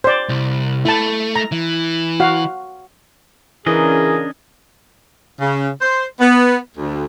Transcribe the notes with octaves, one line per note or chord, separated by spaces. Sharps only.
C5 D5
C2
A3 E4 A5
A#5
E3
F#4 F5
C#3 E3 C#4 D4 G#4 A#4 D#5
C#3
C5
B3
D2